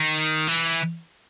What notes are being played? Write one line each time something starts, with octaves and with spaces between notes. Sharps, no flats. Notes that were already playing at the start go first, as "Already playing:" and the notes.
Already playing: D#3
E3